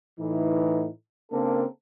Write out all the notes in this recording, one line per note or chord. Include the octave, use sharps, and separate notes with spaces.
A2 E3 D#4
C#3 A#3 C4 D4 A4 A#4